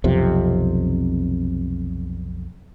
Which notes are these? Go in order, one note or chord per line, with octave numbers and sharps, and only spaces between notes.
B1 F2 C3